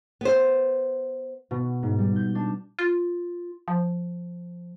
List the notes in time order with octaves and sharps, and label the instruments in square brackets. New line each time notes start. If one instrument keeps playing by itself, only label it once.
[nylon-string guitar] B3 C5
[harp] B2
G#2
G3
G6
D4
[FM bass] F4
F3